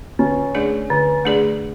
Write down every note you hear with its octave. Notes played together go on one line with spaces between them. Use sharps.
D3 C#4
A3 D4 G#4 D5
D3
A3 D4 G#4 D5